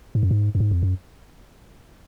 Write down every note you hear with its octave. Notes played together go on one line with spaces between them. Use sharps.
G#2
F#2
G#2
F#2
G#2
F2
F#2